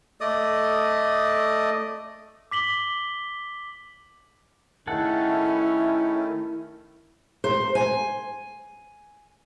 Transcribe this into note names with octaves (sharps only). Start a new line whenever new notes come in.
A3 D5 D#5 D#6
D6 B6 F#7 G7
D#3 A3 C#4 E4 G#4 A4 F#5
C5
G#5